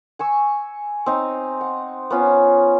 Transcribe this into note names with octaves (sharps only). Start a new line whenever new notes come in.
G#5 C#6 E6
C4 D#4
F#5
B3 C#4 F4